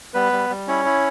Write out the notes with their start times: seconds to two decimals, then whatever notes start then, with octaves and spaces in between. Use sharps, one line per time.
0.14 G3 B3 B4
0.33 G3
0.50 G3
0.67 C#4 E4 C#5
0.85 E4